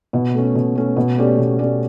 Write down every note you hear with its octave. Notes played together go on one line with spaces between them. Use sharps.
B2
A3 C#4
B2
A3 C#4
B2
A3 C#4 G4 D5
B2
A3 C#4 G4 D5